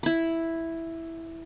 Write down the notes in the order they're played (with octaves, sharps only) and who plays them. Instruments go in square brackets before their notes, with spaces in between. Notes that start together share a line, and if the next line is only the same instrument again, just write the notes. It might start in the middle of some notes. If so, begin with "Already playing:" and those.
[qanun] E4 B5